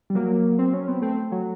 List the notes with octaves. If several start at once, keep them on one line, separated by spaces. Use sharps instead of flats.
G3
F#3 A#3
C4
F#3 C#4
B3 C4
A3 C4
F#3